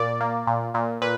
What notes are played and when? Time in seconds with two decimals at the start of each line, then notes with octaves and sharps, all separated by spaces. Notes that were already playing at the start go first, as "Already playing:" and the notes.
Already playing: A#2 D5
0.21 A#3
0.47 A#2
0.74 A#2
1.02 A#2 B4